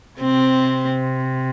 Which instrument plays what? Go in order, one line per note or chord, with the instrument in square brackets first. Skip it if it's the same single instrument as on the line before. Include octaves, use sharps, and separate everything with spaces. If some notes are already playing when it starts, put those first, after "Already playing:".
[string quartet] C3 [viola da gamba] C4